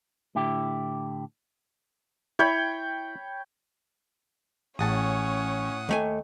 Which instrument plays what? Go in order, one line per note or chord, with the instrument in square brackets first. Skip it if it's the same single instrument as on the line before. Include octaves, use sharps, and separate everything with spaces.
[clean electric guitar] A2 D3 E4 G4
[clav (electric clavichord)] E4 [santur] C#5 G5 B5
[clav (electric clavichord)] A1 G#4 A5 [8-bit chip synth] A2 F#5 D#6 [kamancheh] C#4 C#5
[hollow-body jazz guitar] D#2 A3 G#5